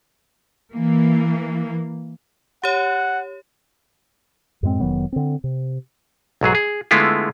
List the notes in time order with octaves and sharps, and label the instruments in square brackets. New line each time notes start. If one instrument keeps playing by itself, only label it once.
[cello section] E3 A#3
[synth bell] G4 C#5 [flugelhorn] F#5
[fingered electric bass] F#2 A2 G#3 C4
F1 D#3 F#3 B3
D3 C4
C3
[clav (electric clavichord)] B1 G#2 F#3 G#4
G#4
D3 G#3 A3 B3 E4 F4